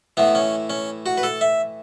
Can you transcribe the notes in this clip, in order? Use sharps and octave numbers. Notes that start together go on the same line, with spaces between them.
A2 E3 B3
C#4
C#4
F#4
B4
A4
E5